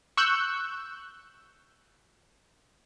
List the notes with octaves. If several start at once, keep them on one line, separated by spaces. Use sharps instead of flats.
C#6 E6 F#6 G6